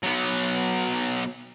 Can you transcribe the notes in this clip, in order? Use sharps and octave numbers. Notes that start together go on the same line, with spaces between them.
F#3 B3